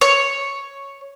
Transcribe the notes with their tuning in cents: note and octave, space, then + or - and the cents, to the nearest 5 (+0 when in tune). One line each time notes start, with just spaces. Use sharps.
C#5 +0 C#6 +0